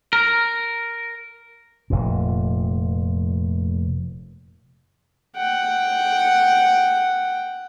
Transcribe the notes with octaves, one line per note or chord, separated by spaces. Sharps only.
A#4
F1 A#2
F#5 G5